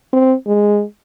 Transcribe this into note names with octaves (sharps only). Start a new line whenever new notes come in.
C4
G#3